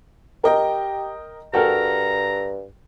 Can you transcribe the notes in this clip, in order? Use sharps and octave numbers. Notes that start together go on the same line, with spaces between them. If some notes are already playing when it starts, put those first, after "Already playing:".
G4 A#4 D#5 G5
G2 F#4 A4 A#4 G5 A#5